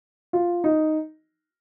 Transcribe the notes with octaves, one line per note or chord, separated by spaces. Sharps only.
F4
D#4